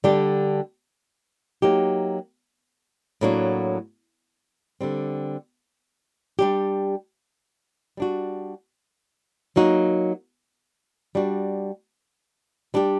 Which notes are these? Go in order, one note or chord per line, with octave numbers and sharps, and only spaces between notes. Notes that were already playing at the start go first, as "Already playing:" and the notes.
D3 G3 D4 G4
F#3 A#3 D#4 G4
A2 F#3 A#3 D4 F#4
D3 G3 C4
G3 D4 G4
G3 D4 F#4
F#3 A#3 D#4 F#4
G3 D4 F#4
G3 D4 G4